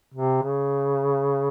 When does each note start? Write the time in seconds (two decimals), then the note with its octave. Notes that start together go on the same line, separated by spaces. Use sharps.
0.14 C3
0.43 C#3